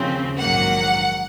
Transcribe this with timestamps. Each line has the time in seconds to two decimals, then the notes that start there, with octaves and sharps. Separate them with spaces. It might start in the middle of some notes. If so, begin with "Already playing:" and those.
Already playing: D#2 C#3 F3 C4
0.39 A#1 G#2 D#3 F#3 A#3 F#5